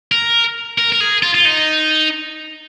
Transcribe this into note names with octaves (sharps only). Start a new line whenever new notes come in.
A#4
A#4
A#4
G#4
F4
F4
D#4